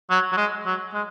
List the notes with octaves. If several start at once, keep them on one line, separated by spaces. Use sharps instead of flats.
F#3
F#3
G#3
F#3
G#3